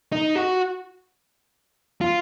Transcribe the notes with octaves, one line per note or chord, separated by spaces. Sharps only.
D#4
F#4
F4